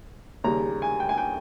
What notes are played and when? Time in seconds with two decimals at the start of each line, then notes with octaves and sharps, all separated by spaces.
0.44 D#2 C#3 G3 A#5
0.82 G#5
1.00 G5
1.09 G#5
1.18 G5